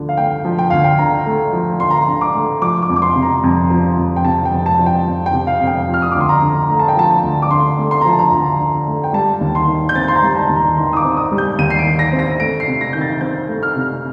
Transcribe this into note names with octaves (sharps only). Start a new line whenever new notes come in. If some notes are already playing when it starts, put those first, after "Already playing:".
Already playing: D2 D3 F3
F5
A3 G5
F3
G5
D2 F5
G5
D3 A#5
A3
F3
D2 C6
A#5
C6
D3
D6
A3
F3 D6
D6
F2
D6
C6
C3
A#5
F2
F3
F2
G5
C3 A5
G5
F2
A5
F3
G5
F2
G5
C3
F5
F2
G5
F3
F6
D#6
D2 D6
C6
A#5
D3
A3 A#5
A5
G5
F3 A5
D2
D6
D3 C6
A3
C6
F3 A#5
A5
A#5
D2
D3
A3
G5
G3 A5
D#2
C6
D#3
G6
C4 A6
C6
A#5
G3
A5
D#2
A#5
D#3 C6
D#6
D6
C4
D#6
G3
G6
D#2 D#7
C7
D7
D#3
A#6
C4
A#6
A3 D7
C7
C3
A#6
D#3 G6
A6
C4 G6
A3
F6
C3